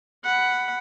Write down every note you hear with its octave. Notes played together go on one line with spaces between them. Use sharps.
F#5 B5